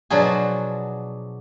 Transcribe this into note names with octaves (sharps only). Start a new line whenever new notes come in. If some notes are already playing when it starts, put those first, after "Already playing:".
B2 F3 F#3 D4 F#4 G#4